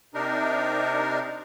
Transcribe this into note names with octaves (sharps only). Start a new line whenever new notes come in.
C3 D4 D#4 A#4